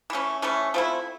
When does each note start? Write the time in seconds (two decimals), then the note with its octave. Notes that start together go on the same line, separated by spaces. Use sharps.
0.10 E3 A3 C#4
0.42 E3 A3 C#4
0.74 F3 A3 C4 E4